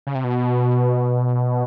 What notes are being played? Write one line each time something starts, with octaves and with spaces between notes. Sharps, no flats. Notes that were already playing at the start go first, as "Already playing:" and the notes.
C#3
C3
B2